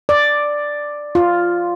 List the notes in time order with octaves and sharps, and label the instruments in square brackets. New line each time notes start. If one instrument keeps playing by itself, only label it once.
[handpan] D5
F4